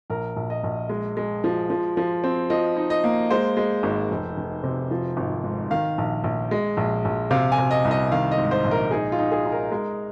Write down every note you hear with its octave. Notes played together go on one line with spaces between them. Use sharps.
A#1 A#4
A#1
D#5
A#1
G#3
G#3
F3
F3
F3
C4
F3 D#5
D#4
D#5
A#3
G#3 C5
G#3
G#1
F1
F1
C3
F3
G#1
G#2
D#3 F5
A#1
A#1
G#3
A#1
A#1
C3 F5
G#5
C3
D#5
C2
D#5
D#3 F5
D#5
G#2
C5
A#1
A#4
D#4 G#4
F4
D#4
G#4
D#4
A#4
G#3